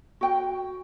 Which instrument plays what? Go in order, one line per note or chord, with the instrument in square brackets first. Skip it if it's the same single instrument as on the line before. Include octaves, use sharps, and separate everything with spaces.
[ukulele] F#4 G5